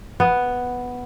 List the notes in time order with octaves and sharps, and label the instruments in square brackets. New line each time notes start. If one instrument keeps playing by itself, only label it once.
[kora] B3